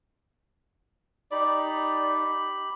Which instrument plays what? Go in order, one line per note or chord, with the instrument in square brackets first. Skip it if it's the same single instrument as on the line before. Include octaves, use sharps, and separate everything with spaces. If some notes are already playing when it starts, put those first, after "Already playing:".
[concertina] D#4 [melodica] G4 B5 [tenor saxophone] D5